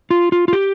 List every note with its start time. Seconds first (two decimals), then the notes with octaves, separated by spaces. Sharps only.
0.11 F4
0.32 F4
0.48 F4
0.53 G4